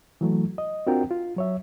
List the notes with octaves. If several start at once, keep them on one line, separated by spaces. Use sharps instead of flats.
E3 F#3 A3
D#5
C4 D4 F4 F#4 A#4 G5
F4
F#3 C#5 E5